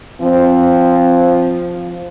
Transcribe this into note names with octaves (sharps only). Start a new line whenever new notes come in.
F3 C4